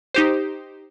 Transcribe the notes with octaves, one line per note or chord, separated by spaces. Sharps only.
D#4 G4 C5